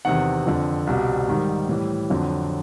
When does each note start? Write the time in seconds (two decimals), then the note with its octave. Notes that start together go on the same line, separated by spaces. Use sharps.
0.05 E2 C3 D#3 F#5
0.46 F2 D3 F3
0.87 C2 B2 G3
1.28 G#2 D#3 G3
1.69 A2 E3 G3
2.10 F2 D3 F#3